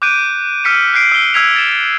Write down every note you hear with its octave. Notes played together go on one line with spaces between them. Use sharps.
D6 F#6 G6 D7 D#7
E6 F6 B6 C#7 D#7
F#6 G6 C7 D7
E6 G7
E6 F6 G#6 B6 F7
A6 E7